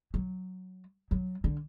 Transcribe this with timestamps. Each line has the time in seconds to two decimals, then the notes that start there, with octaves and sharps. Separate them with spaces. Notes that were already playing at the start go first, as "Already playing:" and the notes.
0.14 F#3
1.11 F#3
1.44 D3